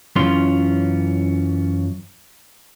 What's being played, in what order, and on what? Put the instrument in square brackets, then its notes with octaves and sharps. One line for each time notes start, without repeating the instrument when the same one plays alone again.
[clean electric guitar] F#2 E3 C#4 F4 C6